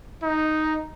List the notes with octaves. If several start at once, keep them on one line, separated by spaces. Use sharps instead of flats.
D#4